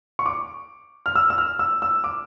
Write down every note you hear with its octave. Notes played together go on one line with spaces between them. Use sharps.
C#6
D6
F6
E6
E6
F6
E6
E6
D6